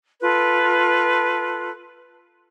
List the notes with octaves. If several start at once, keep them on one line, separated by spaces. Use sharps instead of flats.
F4 A4 B4